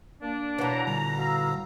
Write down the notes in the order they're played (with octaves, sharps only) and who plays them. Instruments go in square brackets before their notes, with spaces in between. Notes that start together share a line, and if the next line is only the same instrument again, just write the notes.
[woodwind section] A#3 D4
[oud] B2 E3 [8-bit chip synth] C#5 F#5 A5 [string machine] A#5
[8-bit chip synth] A#2 D3 G3
[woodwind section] F#4 F5 E6